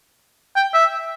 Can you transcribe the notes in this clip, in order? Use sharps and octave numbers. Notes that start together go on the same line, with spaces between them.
G5
E5